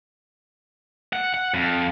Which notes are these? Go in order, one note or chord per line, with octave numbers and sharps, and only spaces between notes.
F#5
F#5
F2